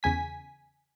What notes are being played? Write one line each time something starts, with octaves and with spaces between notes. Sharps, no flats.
E2 C#3 G#5 B6